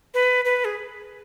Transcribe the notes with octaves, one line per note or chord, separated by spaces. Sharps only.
B4
B4
G#4